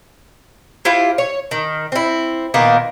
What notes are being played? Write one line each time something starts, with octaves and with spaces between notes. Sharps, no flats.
E4 F4 G4 C5
C#5
D#3
C4 E4
A#2 D#3 A#3 B3